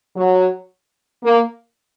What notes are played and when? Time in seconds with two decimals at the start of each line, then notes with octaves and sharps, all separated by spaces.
0.15 F#3
1.23 A#3